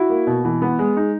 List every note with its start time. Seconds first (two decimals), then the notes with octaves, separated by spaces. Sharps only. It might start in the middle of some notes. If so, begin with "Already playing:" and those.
Already playing: E4 F#4
0.10 A#3
0.27 B2
0.45 E3
0.62 B3
0.79 G#3
0.97 D#4